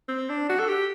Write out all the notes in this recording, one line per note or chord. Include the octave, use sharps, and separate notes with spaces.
C4
D4
F#4
A4
G4